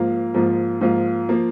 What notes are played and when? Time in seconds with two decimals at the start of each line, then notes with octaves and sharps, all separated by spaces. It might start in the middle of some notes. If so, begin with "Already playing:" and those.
Already playing: G#2 F3 A#3 F4
0.34 G#2 F3 A#3 F4
0.81 G#2 F3 A#3 F4
1.29 F3 A#3 F4